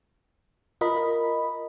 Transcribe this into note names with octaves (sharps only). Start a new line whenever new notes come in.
F4 A#4 D#5 B5